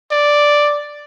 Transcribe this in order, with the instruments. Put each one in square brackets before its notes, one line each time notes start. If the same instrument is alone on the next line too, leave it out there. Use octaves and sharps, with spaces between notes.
[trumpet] D5